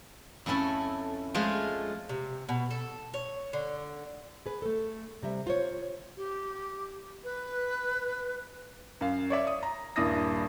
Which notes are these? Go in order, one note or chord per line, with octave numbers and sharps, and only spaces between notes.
F2 A3 C#4 E4 A4
F3 G#3 A3 F4
C3
B2
A4
C#5
D3
G#4 B4
A3 A4
C3 G3 E5
F4 C5 C#5
G4
B4
F#2 F5
C#5 D5 E5
D#6
A#5
D#1 G2 E4 D#6 A#6